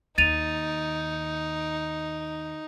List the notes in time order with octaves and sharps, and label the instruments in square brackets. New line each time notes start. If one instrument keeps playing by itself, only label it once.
[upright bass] D#2 [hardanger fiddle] D#4 [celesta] A6 D#7 F7